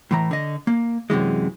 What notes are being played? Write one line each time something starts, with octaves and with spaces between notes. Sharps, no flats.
A2 E3 A#5
D3 D#5
A#3
F#2 C3 E3 G#3